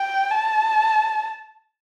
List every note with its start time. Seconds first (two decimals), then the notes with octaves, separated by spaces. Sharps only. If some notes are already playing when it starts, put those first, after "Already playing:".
Already playing: G5
0.31 A5